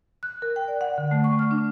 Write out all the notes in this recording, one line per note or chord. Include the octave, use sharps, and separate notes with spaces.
F#6
A#4
G5
D5
F#5
D3
A3
C#6
F6
D4